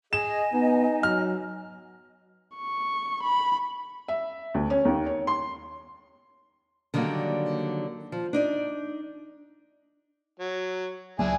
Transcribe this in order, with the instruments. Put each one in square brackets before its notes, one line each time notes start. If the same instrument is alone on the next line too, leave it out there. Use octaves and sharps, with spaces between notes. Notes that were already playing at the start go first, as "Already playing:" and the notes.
[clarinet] G#4 [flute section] D#5 G#5 [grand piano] E7
[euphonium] B3 [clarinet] D#4
[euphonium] F#3 [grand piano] F6
[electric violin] C#6
B5
[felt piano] E5
D2
C#4
D#2
C#5
C6
[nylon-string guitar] D3 D#3 F#3 G3 A#3
F3
D4 D#4 D5
[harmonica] F#3
[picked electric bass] C#2 F#3 A#3 [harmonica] D4 E4 G#4 [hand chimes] G#5